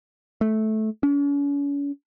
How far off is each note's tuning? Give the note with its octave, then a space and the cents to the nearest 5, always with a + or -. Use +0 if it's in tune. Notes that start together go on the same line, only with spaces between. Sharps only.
A3 -15
C#4 +40